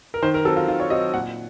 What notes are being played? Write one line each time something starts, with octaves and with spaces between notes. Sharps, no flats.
A#4
D#3 C5
A#4
F#3 C4 A4
F4
D#3 F4
C#5
F#3 C4 D#5
A#2 F#5